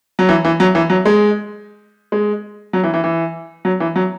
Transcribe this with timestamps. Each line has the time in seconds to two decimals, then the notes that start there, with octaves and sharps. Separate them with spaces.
0.19 F#3
0.29 E3
0.45 E3
0.60 F#3
0.75 E3
0.90 F#3
1.05 G#3
2.12 G#3
2.73 F#3
2.84 E3
2.94 E3
3.04 E3
3.65 F#3
3.80 E3
3.96 F#3